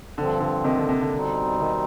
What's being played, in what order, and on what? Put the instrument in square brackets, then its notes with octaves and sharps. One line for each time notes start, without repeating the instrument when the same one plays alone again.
[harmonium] G2 F3 C4 [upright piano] D3
[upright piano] D3
C3 D#3
D3
C3
D3
[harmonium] B2 G3 C4 D#4
[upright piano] C3 D#3